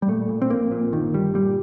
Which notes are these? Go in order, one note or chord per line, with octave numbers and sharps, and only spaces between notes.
G3
A#2 A3
A#2
C4
A#1 A#3
A#2
G1 D#3
G1 G3
A#2 G3